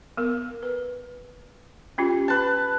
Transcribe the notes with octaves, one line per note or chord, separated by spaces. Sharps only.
B3 A#4
B4
C#4 F4 G4
B4 A5